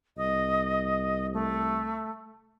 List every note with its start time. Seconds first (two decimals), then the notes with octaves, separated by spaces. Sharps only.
0.17 C2 D#5
1.33 A3